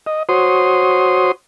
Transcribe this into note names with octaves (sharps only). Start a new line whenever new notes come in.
D#5
F#4 C5 C#5 C6 D#6